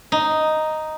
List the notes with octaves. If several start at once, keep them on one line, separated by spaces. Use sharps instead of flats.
D#4